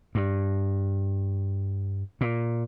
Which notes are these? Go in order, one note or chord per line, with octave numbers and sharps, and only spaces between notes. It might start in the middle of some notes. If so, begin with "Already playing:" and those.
G2
A#2